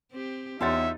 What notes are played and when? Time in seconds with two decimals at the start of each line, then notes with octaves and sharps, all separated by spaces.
0.12 C4 G4
0.61 E2 D#4 F4 G4 C#5 E5 F#5 A6